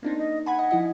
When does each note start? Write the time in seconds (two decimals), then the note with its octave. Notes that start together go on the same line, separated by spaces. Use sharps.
0.03 A#3 C4 D4 D#4
0.18 D#5
0.46 F#5 G#5 B5 G#6
0.59 D#5
0.71 F3 E4 D#5